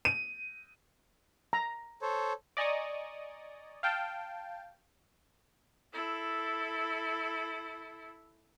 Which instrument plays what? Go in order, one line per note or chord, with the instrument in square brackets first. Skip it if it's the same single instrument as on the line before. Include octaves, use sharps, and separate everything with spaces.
[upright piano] D#7
[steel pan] A#5
[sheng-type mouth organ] A4 C5 C#5
[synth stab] D5 D#5 G#5 A#5 C#6 D#6
F5 G5 A5
[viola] E4 A4